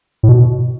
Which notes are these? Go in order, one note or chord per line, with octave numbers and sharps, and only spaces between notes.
A2
B2